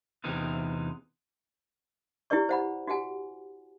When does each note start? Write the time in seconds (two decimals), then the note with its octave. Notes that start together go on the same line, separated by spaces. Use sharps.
0.24 E2 C3 E3 D#4 F4
2.30 E4 G4 B4 D5 C#6
2.49 C5 F#5 B5
2.87 F#4 G4 F#5 G#5